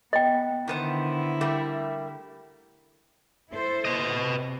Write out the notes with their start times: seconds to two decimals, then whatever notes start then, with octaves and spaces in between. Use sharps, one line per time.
0.13 B3 D#5 G5
0.68 D3 D#3 B3 E4 C5
1.41 G3 A3 A#3
3.51 E4 A4 C5
3.85 B4 D#5
4.15 C3